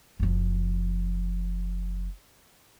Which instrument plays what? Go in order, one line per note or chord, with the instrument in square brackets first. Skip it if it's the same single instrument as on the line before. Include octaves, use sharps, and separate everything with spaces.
[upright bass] F#1 F3